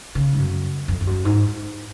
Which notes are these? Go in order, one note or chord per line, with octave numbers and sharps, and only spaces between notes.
C#3
G#2
F#2
F2
F2
F#2
G#2